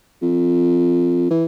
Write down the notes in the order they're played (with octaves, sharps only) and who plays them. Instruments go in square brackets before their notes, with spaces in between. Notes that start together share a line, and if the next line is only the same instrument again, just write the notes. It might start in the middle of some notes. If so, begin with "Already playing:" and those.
[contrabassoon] F2
E3